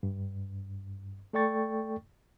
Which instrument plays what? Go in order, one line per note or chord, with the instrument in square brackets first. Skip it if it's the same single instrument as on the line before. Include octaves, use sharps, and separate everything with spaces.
[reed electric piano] G2
A3 A4 D5 G5 C#6 A6